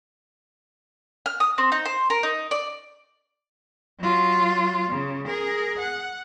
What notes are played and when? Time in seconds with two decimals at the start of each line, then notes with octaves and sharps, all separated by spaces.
1.26 F6
1.40 D#6
1.58 C4
1.72 D#4
1.85 C5
2.10 A#4
2.23 D#4
2.51 D5
4.00 F#3 F4
4.89 C#3
5.27 G#4 A#4
5.79 F#5